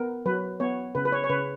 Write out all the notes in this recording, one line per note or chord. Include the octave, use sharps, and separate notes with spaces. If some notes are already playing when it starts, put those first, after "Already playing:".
Already playing: B3 A#4
F#3 B4
B3 C#5
C#3 B4
B4
C#5
C#5
C#3 B4